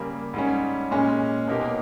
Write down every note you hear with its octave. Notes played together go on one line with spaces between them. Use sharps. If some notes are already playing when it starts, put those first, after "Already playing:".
Already playing: C#3 G3 A#3
G#2 G3 C#4
A#2 G#3 C#4
B2 A#3 D#4 G4